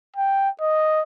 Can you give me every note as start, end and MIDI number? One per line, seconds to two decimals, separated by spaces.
0.16 0.49 79
0.61 1.02 75